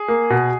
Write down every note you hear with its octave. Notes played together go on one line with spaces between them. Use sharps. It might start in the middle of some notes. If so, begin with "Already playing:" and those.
Already playing: G#4
A#3
B2